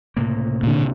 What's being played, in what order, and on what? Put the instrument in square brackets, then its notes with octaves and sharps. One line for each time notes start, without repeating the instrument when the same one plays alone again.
[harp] C#2 C3 [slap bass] A2 A#3
[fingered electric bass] A#2 D3